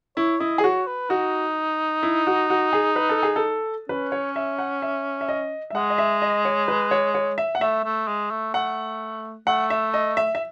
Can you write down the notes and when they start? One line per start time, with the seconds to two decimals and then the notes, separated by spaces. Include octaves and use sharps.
0.17 E4 C#5
0.40 E4 D#5
0.58 G#4
0.63 F#4 C#5
0.87 B4
1.10 D#4 F#4
2.03 E4
2.27 F#4
2.50 F#4
2.73 G#4
2.96 B4
3.09 A4
3.23 G#4
3.36 A4
3.89 C#4 B4
4.12 C#5
4.36 E5
4.59 F#5
4.82 E5
5.21 E5
5.29 D#5
5.70 E5
5.75 G#3 F#5
5.90 D#5
5.98 E5
6.22 D#5
6.45 C#5
6.68 B4
6.91 C#5
7.14 C#5
7.38 E5
7.55 F#5
7.61 A3 E5
7.84 A3
8.08 G#3
8.31 A3
8.54 A3 F#5
9.47 A3 F#5
9.70 E5
9.94 D#5
10.17 E5
10.35 E5